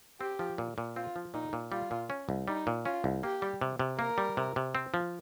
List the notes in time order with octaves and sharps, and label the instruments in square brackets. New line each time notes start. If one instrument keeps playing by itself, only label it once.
[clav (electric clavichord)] C4 [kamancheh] G4
[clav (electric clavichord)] F3
A#2
A#2
[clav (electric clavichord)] C4 [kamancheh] F4
[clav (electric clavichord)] F3
[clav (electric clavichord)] A#2 [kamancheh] D#4
[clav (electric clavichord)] A#2
[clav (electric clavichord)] G3 [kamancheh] F4
[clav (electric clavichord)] A#2
C#4
C2
[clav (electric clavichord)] G3 [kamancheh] D#4
[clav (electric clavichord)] A#2
[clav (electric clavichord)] C#4 [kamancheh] F4
[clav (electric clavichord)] C2
[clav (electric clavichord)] A#3 [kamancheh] G4
[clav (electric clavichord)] G3
C3
C3
[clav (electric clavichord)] A#3 [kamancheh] A#4
[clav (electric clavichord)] G3
C3
C3
C4
F3